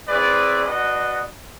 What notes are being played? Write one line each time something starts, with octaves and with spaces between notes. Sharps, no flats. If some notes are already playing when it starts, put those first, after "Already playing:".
C4 E4 G#4 B4 D5
D4 F#4 B4 D#5